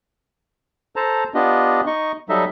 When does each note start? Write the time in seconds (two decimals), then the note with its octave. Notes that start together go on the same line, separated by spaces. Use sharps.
0.96 A4 C5 A5 A#5
1.34 B3 D4 F4 G4 D#5
1.87 D#4 D#5 C#6
2.29 F#3 G3 D#4 A4 D#5 E5